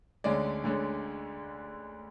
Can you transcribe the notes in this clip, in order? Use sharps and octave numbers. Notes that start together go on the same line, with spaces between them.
D2 D3 G#3 C#4 D5
D2 D3 G#3 C#4